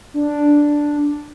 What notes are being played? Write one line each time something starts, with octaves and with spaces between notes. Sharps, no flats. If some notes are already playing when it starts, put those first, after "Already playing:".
D4